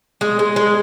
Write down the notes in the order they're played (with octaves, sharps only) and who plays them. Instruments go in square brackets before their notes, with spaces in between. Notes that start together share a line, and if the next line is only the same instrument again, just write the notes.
[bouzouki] G#3
G#3
G#3